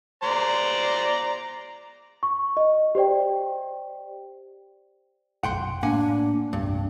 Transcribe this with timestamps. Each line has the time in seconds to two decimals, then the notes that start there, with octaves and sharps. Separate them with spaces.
0.23 C5 D5 A#5
2.23 C#6
2.57 D#5
2.95 G4 C5 D5 G5
5.43 F1 B1 F#2 F#5 G5 C6
5.83 A2 A#3 D4 F#5 G#5
6.53 E1 C2 G2 A#3 D4